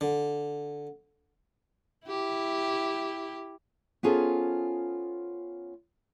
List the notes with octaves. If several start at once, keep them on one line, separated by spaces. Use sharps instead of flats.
D3
E4 G4
B3 C#4 F4 G#4 A4 C5